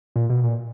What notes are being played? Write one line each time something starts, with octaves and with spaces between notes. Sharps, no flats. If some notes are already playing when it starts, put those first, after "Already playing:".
A#2
B2
A#2